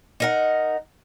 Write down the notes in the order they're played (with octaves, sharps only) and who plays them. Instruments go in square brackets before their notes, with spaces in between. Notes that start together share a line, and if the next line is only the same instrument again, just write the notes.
[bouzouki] D#4 A#4 F#5